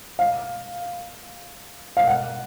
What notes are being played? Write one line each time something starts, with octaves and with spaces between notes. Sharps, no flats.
F5
F5
F#5